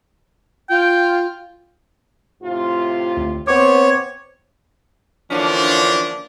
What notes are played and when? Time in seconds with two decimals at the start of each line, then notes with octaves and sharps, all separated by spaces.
0.70 F4 G5
2.43 A2 C3 F4
3.17 D2
3.47 B3 C4 C5 C#5 D6
5.31 D3 E3 F3 A#3 C#4 D4